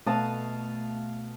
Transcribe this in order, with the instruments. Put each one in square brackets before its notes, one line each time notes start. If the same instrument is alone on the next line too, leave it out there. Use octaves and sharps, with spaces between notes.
[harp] B2 [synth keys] A3 [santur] F5 A5 D#6